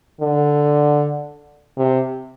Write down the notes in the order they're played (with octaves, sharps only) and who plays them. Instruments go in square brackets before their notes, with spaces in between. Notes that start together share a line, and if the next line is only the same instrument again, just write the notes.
[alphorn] D3
C3